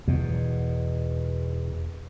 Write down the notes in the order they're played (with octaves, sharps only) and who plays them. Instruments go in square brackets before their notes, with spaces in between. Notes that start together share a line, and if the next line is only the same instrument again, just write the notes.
[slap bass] E2 B2